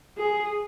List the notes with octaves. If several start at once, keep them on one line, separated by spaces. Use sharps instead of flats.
G#4